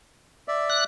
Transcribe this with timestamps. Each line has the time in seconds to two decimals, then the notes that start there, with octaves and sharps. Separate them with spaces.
0.48 D5 E5
0.70 F#6